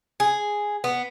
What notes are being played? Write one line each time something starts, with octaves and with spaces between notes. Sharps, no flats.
G#4
B3